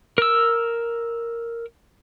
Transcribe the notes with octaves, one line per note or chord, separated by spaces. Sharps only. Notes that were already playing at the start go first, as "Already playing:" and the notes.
A#4 E6